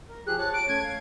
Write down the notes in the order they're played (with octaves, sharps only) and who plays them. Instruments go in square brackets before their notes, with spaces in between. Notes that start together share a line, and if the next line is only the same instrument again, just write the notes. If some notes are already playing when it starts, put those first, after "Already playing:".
[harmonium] A#4
[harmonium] F3 G4 G#4 [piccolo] F#6
[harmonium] C#5 A5 [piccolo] F#6
[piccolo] D7
[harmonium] A3 C#4 [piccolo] G#6
[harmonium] F5